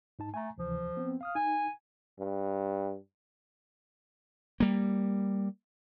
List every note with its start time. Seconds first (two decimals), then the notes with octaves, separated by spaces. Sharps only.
0.19 G#2 D#4 A5
0.34 A3 G#5 A#5
0.58 D2 C3 E3 F3
0.97 B3 C4
1.21 F5 D#6 F6
1.35 D#4 G#5
2.19 G2
4.60 G3 A#3